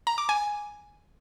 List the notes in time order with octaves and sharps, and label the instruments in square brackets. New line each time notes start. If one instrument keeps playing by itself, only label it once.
[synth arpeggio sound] A#5
D6
G#5